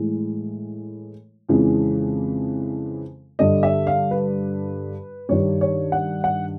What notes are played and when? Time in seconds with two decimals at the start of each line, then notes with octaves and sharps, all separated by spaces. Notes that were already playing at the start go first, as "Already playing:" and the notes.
Already playing: A2 E3 G#3
1.49 F2 C#3 E3 G#3
3.39 G2 D3 G3 D#5
3.63 E5
3.87 F5
4.11 B4
5.29 G2 D#3 G3 C#5
5.61 C#5
5.92 F#5
6.24 F#5